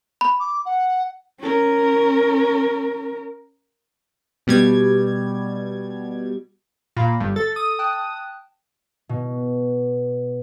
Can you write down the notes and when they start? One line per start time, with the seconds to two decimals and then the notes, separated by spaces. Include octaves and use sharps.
0.21 B5
0.39 D6
0.65 F#5
1.39 C#4 A#4
4.47 B2 G3 G#6
6.96 A#2 F5 B5 A#6
7.20 G1 G2
7.36 A4 A6
7.56 D#6
7.79 G5 A5 F#6
9.09 B2